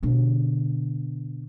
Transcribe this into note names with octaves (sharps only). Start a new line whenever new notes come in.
B2 D3